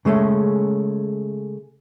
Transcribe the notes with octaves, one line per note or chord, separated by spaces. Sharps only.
C#3 G#3 A3 C#4